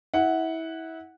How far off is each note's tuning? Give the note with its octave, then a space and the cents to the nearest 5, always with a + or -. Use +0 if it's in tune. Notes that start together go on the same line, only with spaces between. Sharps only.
E4 -25 F#5 +0